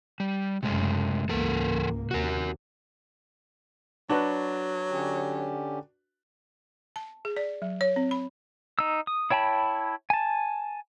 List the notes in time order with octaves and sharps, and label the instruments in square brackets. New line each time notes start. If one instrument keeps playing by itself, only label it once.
[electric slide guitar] G3
[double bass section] F#1 A3 [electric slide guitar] C3 G#3
[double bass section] C#2 G#2 A#3 [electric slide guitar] E3 A4 A#4
[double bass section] D#2 C3 [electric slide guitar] F#4 A#4
[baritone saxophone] F#3 [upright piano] D4 F#4 B4
[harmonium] D3 C#4 G4
[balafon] A5
G#4
D5
F#3
C#5
C4
B5
[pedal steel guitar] D#4 E6
D#6
E4 C#5 G5 A5 B5
G#5 A5